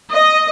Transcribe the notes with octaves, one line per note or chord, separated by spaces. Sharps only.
D#5